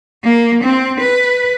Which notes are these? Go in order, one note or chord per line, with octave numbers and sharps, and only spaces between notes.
A#3
C4
B4